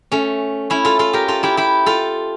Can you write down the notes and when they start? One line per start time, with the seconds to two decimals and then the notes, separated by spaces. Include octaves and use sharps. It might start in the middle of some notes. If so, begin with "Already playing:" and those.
0.12 A3 C#4
0.70 C#4 E4
0.85 F4 A4
0.99 F4 A4
1.13 G4 A#4
1.28 F4 A4
1.43 E4 G4
1.57 E4 G4
1.86 F4 A4